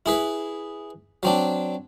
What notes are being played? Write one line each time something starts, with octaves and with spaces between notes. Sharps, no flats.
E4 G#4 B4
F#3 C4 D4